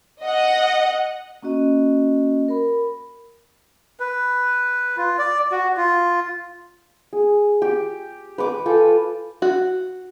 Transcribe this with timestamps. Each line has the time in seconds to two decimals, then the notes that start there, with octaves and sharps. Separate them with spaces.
0.24 D#5 F#5
1.43 A#3 C#4 F#4 D#5
2.48 A#4 B5
4.00 B4
4.97 F4
5.18 D5
5.52 F#4
5.77 F4
7.13 G#4
7.62 G4
8.38 B4 C#6 D6
8.66 F4 A4 G5 G#5
9.42 F#4